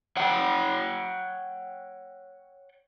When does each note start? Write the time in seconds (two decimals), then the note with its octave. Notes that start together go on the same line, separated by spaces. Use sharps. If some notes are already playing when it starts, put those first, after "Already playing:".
0.17 C#5 F#5 G5